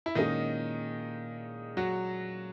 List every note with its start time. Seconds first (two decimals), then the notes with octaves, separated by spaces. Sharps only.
0.06 E4
0.15 A#2 D#3 G#3 C#4 D#4 G#4
1.77 F#3 F#4